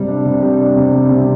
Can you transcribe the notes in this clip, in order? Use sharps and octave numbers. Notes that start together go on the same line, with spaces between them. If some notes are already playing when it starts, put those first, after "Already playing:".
Already playing: C3 G3
D4
C3
G3
D4
C3
G3
C3